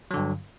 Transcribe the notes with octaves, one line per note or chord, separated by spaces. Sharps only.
G2 D3 F#3